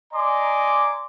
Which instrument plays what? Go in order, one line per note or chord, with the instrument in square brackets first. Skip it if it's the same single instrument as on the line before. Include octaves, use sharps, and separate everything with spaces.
[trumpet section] D5 D#5 G#5 A#5 C6 D6